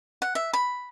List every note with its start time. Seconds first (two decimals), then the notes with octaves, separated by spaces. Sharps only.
0.22 F#5
0.35 E5
0.53 B5